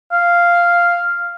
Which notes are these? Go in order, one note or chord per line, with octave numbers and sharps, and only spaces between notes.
F5